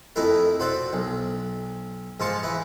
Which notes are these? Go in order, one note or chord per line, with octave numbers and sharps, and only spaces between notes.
F2 A3 D#4 E4 A#4
F#4 C5 D5 E5
B1
G#2 F3 C5 A5 C#6
E3 E4